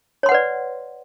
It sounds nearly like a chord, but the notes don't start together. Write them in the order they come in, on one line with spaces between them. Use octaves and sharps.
C#5 C6 F#5 B4 D5